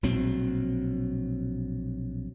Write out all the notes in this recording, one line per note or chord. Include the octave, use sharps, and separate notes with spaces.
A#1 B2 F#3 C4